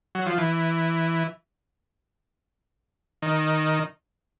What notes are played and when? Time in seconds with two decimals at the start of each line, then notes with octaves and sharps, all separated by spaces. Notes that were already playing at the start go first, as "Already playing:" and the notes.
0.15 F#3
0.26 F3
0.38 E3
3.22 D#3